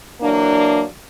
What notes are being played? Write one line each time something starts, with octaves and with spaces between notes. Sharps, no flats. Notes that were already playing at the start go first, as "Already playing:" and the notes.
E3 F#3 A#3 D4